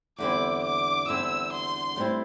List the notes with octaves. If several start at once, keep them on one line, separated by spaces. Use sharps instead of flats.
E2 D3 G3 C4 E4 D6
D6
E2 D3 G3 C4 E4 E6
C6
A2 G3 C4 E4